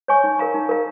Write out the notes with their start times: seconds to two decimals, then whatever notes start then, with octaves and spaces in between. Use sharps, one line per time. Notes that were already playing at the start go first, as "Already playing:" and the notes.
0.08 C#5 G#5 C#6
0.24 D#4
0.39 A#4 F5 A#5
0.54 D#4
0.69 A#4 F5 A#5